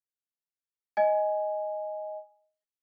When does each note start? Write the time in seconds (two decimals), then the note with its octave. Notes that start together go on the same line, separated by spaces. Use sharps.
0.97 D#5 G#5